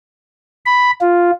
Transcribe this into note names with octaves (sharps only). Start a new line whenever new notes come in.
B5
F4